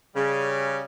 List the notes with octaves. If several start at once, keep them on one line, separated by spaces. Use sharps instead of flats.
C#3 G3